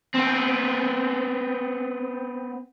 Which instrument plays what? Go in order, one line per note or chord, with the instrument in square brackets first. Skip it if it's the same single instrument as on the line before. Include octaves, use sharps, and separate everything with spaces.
[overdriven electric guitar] B3 C4